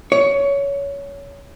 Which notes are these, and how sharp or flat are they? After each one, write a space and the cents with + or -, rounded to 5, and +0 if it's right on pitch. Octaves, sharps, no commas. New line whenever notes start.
C#5 +20